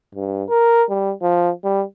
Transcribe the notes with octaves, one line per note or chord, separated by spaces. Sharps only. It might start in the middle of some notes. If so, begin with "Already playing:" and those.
G2
A#4
G3
F3
G3